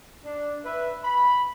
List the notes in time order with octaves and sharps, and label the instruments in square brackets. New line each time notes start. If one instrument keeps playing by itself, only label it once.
[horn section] D4
B4 E5
B5